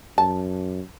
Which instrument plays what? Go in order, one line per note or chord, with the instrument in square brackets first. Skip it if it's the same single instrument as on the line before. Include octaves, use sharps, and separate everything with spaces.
[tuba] F#2 [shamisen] A5